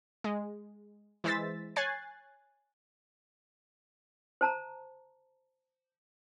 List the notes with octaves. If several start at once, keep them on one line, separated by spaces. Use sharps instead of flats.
G#3
E3 G#3 C5 E6 A6 B6
C#5 G#5 F#6 G#6 A6 C7
C5 A5 A#5